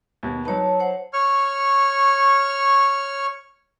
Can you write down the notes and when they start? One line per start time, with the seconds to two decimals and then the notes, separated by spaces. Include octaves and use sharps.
0.23 D#2 B2
0.45 F#3 D#4 B4 C#5 A5
0.80 C5 C#5 F#5
1.13 C#5 C#6 F6